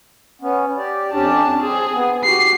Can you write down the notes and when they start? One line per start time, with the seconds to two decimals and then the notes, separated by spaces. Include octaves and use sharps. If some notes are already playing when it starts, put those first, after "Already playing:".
0.42 B3 C#4
0.77 G4 D5
1.12 F2 C#4 D4 G4 A5
1.62 C4 G#4
1.94 B3
2.24 F#4 G4 C7